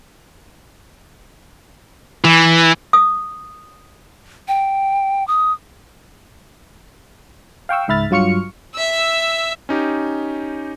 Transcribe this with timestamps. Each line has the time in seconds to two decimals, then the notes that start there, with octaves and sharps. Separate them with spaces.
2.24 E3
2.93 D#6
4.48 G5
5.28 D#6
7.69 F5 G5 C#6 E6
7.88 C#2 G#2 E5 B5 F6 A6
8.11 G2 F#3 F4 C#6 F6 C#7
8.74 E5 E6
9.69 C#4 D#4 G4